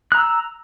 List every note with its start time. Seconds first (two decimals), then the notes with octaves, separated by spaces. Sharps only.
0.12 F#6
0.15 A#5
0.17 E6